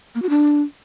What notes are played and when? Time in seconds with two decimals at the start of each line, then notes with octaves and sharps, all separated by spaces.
0.15 A#3
0.22 F#4
0.30 D4